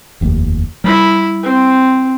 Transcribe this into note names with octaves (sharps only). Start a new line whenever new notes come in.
F1 D#2
G3 E4 B5
C4